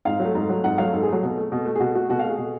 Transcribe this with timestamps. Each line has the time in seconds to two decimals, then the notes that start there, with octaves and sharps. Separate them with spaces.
0.05 G#2 F5
0.20 F#3
0.25 A3
0.35 G#2
0.49 F#3 A3
0.64 G#2 F#5
0.78 F#3 A3 F5
0.93 G#2 A4
1.03 G#4
1.08 F#3 A3
1.23 B2
1.37 A3
1.52 B2
1.65 A3
1.75 G#4
1.80 B2 F#4
1.95 A3 F#4
2.09 B2 F#4
2.19 A3 F5
2.29 G#4
2.38 B2